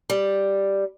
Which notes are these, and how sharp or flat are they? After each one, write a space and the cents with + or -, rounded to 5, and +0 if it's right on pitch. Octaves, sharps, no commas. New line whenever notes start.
G3 +0